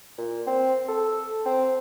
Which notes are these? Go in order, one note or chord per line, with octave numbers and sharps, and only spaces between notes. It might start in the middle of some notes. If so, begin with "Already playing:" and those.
A#2
C4
A4
C4